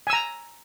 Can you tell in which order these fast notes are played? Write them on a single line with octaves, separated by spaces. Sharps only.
G#5 E6 A#5